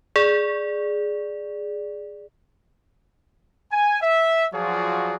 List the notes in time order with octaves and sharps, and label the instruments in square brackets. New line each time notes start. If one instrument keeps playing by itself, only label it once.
[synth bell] G#4 D5
[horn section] G#5
E5
F3 F#3 F4 F#4 G#4 D5